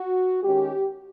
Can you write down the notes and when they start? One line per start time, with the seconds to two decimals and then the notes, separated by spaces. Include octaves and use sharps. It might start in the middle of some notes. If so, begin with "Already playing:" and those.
Already playing: F#4
0.43 D#3 G#3 C#4 G4